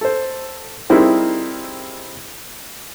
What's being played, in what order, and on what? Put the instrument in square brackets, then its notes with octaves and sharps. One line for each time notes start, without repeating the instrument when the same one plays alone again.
[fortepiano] A4 C5
G3 C4 D#4 E4 G#4 A#4